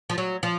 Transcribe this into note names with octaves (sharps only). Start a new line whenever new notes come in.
F3
F#3
F3